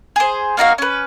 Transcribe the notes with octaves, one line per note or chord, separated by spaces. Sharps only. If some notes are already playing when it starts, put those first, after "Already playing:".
G#4 C5
A#3 D#4 F#4 F5
C#4 B4